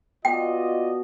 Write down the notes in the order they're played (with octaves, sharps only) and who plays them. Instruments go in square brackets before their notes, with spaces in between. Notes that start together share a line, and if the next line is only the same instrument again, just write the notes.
[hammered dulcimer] B2 [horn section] F4 D5 D#5 [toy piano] G5